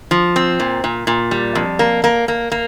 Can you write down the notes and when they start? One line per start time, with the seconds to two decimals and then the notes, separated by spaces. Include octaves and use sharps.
0.11 F3
0.36 C4
0.60 A#2
0.84 A#2
1.07 A#2
1.31 G3
1.55 F2
1.79 A#3
2.04 A#3
2.28 A#3
2.52 A#3